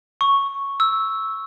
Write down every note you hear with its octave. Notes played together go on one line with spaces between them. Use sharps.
C#6
E6